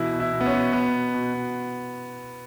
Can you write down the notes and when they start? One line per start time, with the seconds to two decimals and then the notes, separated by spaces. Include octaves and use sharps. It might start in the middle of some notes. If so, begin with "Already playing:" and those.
Already playing: B2 E3 E4
0.13 B2
0.20 E4
0.33 B2
0.41 B3
0.46 C#4
0.53 B2
0.73 B2 B3
0.93 B2
1.14 B2
1.34 B2